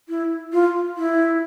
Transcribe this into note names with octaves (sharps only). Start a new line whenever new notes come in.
E4
F4
E4